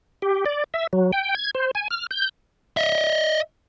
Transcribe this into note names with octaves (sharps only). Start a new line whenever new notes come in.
G4
D5
E5
F#3
G5
G#6
C5
G#5
F6
G6
D#5 E5